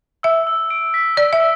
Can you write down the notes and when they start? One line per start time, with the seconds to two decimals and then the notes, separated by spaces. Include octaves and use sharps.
0.23 E5 E6
0.47 E6
0.70 D7
0.94 B6
1.17 D5 E6
1.33 E5
1.40 E6